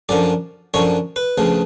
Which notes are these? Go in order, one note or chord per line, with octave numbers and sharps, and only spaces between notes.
F#2 D3 F3 D5
F#2 D3 F3 C#5
B4
D2 C#3 F3